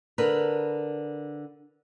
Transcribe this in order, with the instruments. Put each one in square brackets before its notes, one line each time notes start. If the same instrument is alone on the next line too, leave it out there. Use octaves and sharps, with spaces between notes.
[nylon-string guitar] D3 A#4 B4